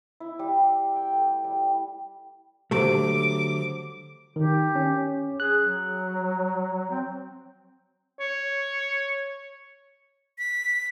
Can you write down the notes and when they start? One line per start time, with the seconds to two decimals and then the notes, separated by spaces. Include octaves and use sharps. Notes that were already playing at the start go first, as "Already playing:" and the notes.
0.20 E4
0.39 G3
0.57 D5
0.96 G5
1.13 A3
1.44 G3
2.71 D3 F#3 A3 G4 C5 D6
4.36 D#3 G4
4.75 C#4
5.40 G#4 F#6
5.61 F#3
6.91 C4
8.20 C#5
10.39 B6